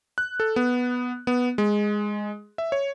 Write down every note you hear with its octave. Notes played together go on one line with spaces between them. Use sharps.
F#6
A4
B3
B3
G#3
E5
C#5